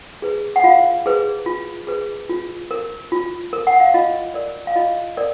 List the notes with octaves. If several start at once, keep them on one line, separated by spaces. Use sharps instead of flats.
G#4 B4
F#5
F4 F5
G#4 B4
F4
G#4 B4
F4
A#4
F4
A#4
F#5
F5
F4 D#5
A#4 D5
F5
F4 D#5
A#4 D5